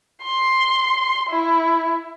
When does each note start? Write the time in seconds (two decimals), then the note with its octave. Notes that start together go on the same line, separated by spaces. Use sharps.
0.23 C6
1.29 E4